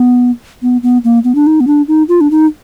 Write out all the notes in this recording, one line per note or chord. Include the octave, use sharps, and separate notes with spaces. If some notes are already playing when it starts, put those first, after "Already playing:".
Already playing: B3
B3
B3
A#3
B3
D4
D#4
B3
D4
D#4
F4
D4
D#4